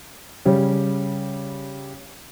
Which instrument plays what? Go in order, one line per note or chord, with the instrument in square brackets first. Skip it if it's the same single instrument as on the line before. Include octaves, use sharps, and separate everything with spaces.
[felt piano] C#3 G3 C#4